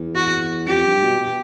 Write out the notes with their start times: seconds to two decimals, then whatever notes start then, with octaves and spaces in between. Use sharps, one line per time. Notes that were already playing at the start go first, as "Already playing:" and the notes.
Already playing: E2
0.15 F#4
0.68 F2 G4
0.85 G2
1.02 B2
1.20 B2